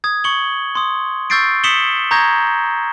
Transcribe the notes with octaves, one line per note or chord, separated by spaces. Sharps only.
D#6 G#6
C#6 C#7 F#7 G7
C6 D#6
C#6 E6 G6 A6 C7 D7
D#6 B6 C#7 E7 F#7 G7
A#5 C#6 D#6 G6 G#6 A#6